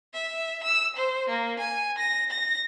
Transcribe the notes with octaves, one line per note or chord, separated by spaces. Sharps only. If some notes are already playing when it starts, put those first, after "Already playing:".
E5
E6
C5
A#3
G#5
A#6
A#6